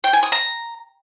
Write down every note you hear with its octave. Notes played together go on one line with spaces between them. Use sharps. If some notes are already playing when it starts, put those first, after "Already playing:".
G5
G#5
D#6
A#5